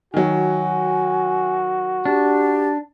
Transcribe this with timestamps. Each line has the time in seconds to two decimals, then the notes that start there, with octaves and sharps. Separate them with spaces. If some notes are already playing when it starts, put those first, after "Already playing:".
0.14 D#3 F#3 F#4 G#5
2.05 D4 G4